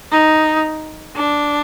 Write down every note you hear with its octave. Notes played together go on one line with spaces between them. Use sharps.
D#4
D4